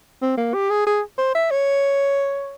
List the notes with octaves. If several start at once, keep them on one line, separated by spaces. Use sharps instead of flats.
C4
A#3
G4
G#4
G#4
C5
E5
C#5